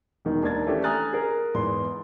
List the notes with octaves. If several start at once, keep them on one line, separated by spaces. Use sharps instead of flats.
E1 D#3 D#4
D#2 D4 A#4 G#6 A6
E3 A3 C#4 D4 G4 A4
G#5 A#5 D#6 F6 F#6 A6
G#4 A#4
E2 G#2 B3 C6